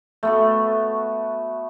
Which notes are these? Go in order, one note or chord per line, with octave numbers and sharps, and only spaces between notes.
A3 B3 F#4